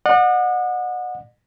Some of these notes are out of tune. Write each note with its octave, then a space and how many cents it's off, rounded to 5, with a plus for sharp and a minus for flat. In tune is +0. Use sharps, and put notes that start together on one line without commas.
D#5 -45 F#5 -25